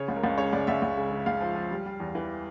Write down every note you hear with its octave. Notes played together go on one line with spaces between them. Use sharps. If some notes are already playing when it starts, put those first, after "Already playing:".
Already playing: C#3 C#5
C#2
A#4
C#2
C#3 C#5
C#2 D5
C#2 E5
C#2
C#3
C#3
C#2 F5
F3
F3
G3
G3
E2
E3